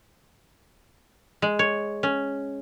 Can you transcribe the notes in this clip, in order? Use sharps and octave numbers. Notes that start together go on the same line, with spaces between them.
G#3
C#5
C#4